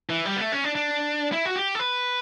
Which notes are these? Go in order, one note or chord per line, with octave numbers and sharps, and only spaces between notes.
E3
G3
B3
A3
C#4
D4
D4
E4
F#4
G4
A4
B4